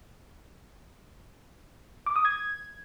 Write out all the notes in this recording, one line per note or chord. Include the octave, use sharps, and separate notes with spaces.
D6
D#6
G#6